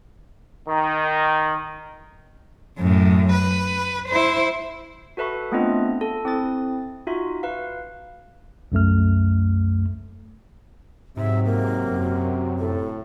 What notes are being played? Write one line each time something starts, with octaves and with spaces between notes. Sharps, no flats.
D#3
F#2 A2
B4
E4 C5
F#4 A4 B4 E5 B5 C#6
A3 B3 C4 D4 F4 D#5
A4
C4 E4 D#6 A6
D#4 F4 F#4 E5
B4 F5
C2 F#2 A3 F6
G#2 C3 F#3 E5
A#3
F#2
A2 A4